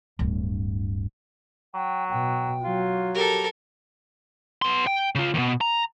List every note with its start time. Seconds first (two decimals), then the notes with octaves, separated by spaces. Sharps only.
0.19 D1 G2
1.75 F#3 G5
2.10 B2 G5
2.64 F#3 F4
3.14 G4 A4 A#4
4.62 B3 C6
4.87 G5
5.15 C#3 F4
5.34 D#2 B2
5.61 A#5